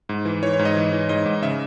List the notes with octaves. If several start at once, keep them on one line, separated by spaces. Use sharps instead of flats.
G#2
E3
E3 C#5
C#5
G#2
D#5
E3
E3
G#2 D#5
G#2
C#3 E5